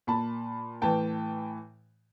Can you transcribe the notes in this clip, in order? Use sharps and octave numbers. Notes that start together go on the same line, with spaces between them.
A#2 A5 B5
A2 E3 G5 A5